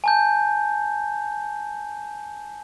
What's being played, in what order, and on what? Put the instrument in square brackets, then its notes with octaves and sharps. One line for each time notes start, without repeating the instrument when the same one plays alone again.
[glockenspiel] G#5 A5 G6